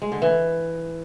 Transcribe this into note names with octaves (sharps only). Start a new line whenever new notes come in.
G#3
D3
E3